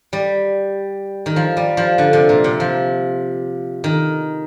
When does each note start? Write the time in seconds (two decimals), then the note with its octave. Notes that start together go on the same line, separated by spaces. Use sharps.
0.13 G3
1.26 D#3
1.36 F3
1.57 G3
1.77 F3
1.98 D3
2.13 C3
2.29 A#2
2.44 C3
2.60 F3
3.84 D#3